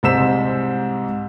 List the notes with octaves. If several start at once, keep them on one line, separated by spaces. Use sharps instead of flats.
C2 G#2 C5 E6 B6 E7